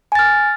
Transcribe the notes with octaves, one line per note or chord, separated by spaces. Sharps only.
G#5 F6 A6